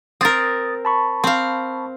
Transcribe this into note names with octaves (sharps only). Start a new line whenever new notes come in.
C4 A#4 D#6 A6
A5 B5 C#6
C4 F5